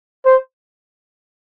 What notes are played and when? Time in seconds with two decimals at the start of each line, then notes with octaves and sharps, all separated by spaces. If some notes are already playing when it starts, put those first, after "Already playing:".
0.26 C5